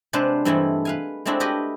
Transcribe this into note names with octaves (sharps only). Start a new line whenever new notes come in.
C3 G#3 D4 B4 C5
G2 C3 E3 G#3 A3 E4
B4 F5 G#5
G#3 A3 C4 D4 E4 F#4
E4 F#4 G4 B4 D#5